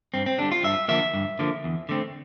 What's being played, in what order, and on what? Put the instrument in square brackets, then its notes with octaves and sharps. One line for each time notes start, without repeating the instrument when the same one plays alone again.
[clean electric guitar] G2 C4
C4
D3 G3 D4
F4
G2 E5
D3 F3 A#3 E5
G2
D3 F3 A#3
E2
D3 A3 C4